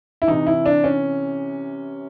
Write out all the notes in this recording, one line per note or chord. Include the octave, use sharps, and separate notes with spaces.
E4
C3 E3 D#4
E4
D4
C#4